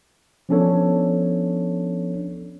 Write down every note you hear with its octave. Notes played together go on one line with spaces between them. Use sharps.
F3 B3 C#4 D4 A4 C#5